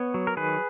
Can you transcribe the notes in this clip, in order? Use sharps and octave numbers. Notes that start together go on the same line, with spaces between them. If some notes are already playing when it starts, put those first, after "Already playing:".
Already playing: B3 C#5
F#3
A#4
D#3 G#4 B4